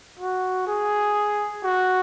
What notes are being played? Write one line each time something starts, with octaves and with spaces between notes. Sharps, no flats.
F#4
G#4
F#4